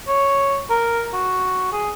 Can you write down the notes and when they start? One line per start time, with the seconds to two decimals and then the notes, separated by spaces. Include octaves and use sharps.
0.08 C#5
0.70 A#4
1.14 F#4
1.72 G#4